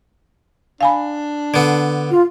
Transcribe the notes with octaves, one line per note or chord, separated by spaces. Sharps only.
D4 F5 G#5 B5
D3 B3
F4